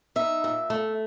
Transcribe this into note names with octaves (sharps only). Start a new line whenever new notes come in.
D#4 E5
A#2
A3